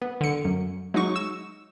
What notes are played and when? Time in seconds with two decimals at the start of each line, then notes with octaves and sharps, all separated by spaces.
0.02 B3
0.21 D3 C#7
0.45 F#2
0.94 F#3 G#3 D#4 C#6
1.16 E6